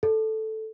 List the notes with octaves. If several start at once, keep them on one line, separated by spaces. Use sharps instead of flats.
A4